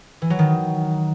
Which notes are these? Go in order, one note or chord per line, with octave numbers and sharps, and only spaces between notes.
E3
F#3
D#3